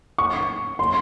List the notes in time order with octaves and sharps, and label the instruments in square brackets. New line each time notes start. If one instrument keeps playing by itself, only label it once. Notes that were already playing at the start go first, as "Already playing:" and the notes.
[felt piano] C#6
C6